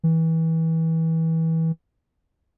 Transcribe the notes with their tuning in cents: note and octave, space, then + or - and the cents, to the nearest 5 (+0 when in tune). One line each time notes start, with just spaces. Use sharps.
E3 -25